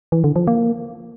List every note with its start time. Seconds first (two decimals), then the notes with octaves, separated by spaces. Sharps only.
0.12 E3
0.24 D3
0.36 F3
0.47 A#3